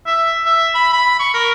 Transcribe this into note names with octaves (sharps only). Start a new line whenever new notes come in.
E5
E5
B5
B5
C#6
A#4